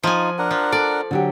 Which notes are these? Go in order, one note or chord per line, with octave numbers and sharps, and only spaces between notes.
F3 D#4 F4 G#5
D4 A#4 F#5
F3
A4 D5
D3 F#3 G4